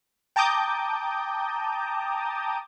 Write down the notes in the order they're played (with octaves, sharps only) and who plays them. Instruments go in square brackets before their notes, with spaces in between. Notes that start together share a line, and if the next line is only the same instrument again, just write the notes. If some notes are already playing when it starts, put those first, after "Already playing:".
[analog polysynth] G5 A5 A#5 D6 D#6 G6